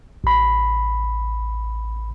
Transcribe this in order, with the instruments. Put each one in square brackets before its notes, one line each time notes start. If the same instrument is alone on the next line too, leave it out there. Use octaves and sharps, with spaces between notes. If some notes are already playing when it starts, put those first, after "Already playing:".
[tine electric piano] A1 B5